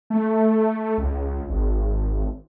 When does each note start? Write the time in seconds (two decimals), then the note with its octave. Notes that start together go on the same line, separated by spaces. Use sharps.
0.10 A3
0.98 C#2
1.49 G#1